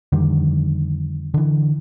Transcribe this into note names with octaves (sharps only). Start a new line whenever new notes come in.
F2 D3 D#3 G3
D3 E3